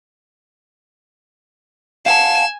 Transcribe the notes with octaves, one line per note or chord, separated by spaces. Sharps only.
F5 F#5 G#5 A5 E7